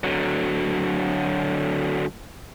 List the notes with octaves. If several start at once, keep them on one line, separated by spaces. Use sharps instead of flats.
D3 F#3